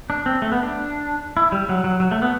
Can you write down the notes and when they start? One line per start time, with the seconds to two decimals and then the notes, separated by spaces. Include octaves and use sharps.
0.10 D4
0.26 C4
0.42 A3
0.52 B3
0.63 D4
1.37 E4
1.52 G3
1.69 F#3
1.84 F#3
2.00 F#3
2.11 A3
2.22 B3